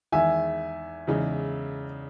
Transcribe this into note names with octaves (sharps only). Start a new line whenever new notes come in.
E2 D#3 G#3 E5 G#5
E2 C#3 G#3 D#4